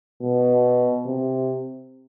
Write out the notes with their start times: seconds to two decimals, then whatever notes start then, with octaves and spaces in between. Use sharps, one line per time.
0.22 B2
1.06 C3